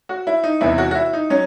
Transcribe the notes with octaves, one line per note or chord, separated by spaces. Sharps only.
F#4
E4
D#4
E2 C3 E3 E4
F#4
F#4
E4
D#4
F#3 C#4